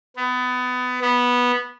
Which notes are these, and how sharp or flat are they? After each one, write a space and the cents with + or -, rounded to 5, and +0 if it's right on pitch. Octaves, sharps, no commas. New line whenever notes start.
B3 +25
B3 -10